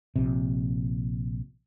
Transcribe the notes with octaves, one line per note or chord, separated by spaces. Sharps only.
A#1 C3